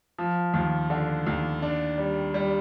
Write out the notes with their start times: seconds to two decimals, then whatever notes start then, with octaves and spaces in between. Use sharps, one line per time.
0.18 F3
0.54 D#2
0.90 D3
1.27 D#2
1.62 D4
1.98 G3
2.34 G3